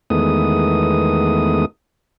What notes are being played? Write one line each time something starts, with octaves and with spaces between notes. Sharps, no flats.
E2 D#3 G#3 A3 B3 D#6